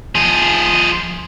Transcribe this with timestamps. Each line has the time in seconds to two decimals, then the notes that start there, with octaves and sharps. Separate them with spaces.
0.15 F3 G#4